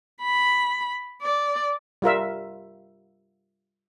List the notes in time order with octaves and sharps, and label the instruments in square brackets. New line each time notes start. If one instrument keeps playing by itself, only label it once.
[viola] B5
D5
[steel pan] G3 F4 A#4 E5